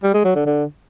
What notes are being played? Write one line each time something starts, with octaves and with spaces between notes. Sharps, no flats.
G3
G#3
F#3
D3
D3